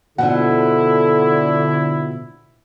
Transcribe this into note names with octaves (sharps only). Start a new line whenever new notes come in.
B2 D3 F3 D4 E4 F#5